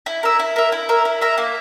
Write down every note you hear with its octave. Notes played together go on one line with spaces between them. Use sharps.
E4
A#4 E5
E4
A#4 E5
E4
A#4 E5
E4
A#4 E5
A#3